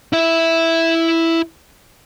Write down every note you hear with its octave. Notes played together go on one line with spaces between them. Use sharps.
E4 E5